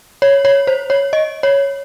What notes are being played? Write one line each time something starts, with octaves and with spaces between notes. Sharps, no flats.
C#5
C#5
C5
C#5
D#5
C#5